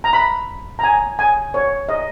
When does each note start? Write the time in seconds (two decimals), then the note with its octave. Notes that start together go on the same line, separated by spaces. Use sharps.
0.04 A#5
0.13 B5
0.79 A#5
0.84 G#5
1.19 G#5
1.54 C#5
1.89 D#5